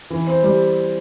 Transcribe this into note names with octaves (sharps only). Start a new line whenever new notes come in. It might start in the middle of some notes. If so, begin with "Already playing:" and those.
E3
C4
G3